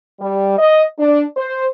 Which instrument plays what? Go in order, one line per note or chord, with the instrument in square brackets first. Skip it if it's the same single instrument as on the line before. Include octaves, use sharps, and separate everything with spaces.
[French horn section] G3
D#5
D4
C5